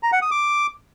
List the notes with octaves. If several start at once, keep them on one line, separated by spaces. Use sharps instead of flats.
A#5
F#5
D#6
D6